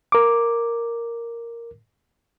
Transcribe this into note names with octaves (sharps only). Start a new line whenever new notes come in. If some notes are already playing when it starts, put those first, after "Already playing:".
A#4 D6